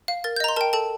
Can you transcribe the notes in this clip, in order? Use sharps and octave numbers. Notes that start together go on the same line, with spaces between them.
F5
A#4 A6
G6
D#5 A#5
C6
A#4 G5 A5
A4 A5